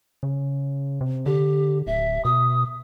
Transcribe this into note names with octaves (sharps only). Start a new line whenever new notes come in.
C#3
C3
D3 G4
D1 E5
B2 D#6